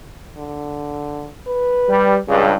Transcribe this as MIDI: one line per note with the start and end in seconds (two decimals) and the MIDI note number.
0.37 1.28 50
1.47 2.18 71
1.89 2.19 55
2.28 2.55 37
2.28 2.55 43
2.28 2.50 49